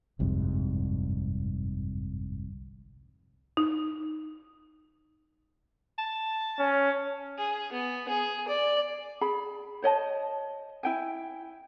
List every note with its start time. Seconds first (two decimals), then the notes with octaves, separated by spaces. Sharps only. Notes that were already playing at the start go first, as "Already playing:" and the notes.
0.19 G1 C2 F2 G#2
3.57 D#4
5.98 A5
6.59 C#4
7.38 G#4
7.73 B3
8.09 G#4
8.48 D5
9.21 G#4 B5
9.82 C5 C#5 D#5 A5
10.83 E4 G5 G#5